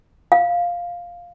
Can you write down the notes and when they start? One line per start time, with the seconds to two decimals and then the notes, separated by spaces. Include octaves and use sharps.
0.32 F5